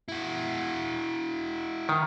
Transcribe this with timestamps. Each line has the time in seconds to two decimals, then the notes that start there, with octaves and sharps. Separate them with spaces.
0.08 E4 F#4
1.89 D#3